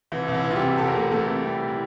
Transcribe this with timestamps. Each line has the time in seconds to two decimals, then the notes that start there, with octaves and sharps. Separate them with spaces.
0.12 C2 E3 E4
0.28 C2
0.33 E3 E4
0.45 E3
0.50 F4
0.56 G3 G4
0.62 C3
0.78 C2 A4
0.87 A#4
0.94 C2 A3 A4
1.11 E3 A3 A4
1.28 C3
1.44 C2 G3 G4
1.68 E4